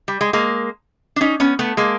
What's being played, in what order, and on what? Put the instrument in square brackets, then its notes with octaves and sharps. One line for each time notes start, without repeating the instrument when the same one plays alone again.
[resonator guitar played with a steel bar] G3
G#3
G#3 A#3
D4
C#4 D#4
B3 C#4
A3 B3
G#3 A#3